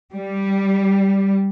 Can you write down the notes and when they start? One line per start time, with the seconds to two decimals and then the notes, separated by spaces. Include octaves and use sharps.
0.13 G3